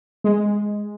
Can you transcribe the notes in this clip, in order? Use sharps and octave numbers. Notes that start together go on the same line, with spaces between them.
G#3